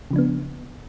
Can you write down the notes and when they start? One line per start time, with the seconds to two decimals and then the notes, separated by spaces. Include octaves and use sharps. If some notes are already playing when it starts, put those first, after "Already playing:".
0.11 C#3
0.13 F3
0.16 D4
0.18 B3